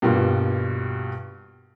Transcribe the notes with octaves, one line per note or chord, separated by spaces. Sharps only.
G2 B2 G3 A#3 F4